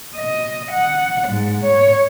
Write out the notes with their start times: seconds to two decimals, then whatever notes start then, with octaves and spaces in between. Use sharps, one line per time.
0.15 D#5
0.70 F#5
1.27 G#2
1.63 C#5